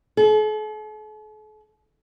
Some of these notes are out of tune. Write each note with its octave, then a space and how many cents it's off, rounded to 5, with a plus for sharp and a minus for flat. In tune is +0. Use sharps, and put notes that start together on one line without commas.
A4 -45